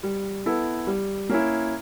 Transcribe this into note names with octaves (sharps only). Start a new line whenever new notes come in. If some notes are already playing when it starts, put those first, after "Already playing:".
G3
B3 E4 A4
G3
A#3 C#4 E4